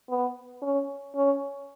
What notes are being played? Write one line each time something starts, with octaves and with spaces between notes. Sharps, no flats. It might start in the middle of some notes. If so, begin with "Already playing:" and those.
B3
C#4
C#4